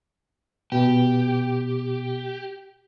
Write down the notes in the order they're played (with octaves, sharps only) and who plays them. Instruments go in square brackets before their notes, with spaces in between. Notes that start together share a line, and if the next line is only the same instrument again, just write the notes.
[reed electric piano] B2 [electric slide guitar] G4